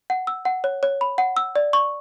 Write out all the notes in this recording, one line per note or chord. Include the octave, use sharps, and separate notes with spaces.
F#5
E6
F#5
C#5
C#5
B5
F#5
E6
D5
C#6